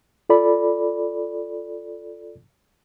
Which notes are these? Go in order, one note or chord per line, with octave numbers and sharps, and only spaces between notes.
F4 A4 D5 B5